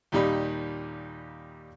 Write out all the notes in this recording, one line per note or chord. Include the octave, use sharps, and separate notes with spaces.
D#2 A#2 G3 D#4 G4 B5